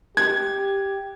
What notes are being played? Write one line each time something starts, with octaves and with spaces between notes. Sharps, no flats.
G4 G#6